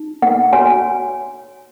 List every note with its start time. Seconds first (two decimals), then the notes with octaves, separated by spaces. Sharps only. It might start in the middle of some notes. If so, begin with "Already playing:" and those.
Already playing: D#4
0.22 F#5
0.53 F#4 C#5 G#5